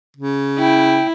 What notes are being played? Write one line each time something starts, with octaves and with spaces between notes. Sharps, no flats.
C#3
E4 G5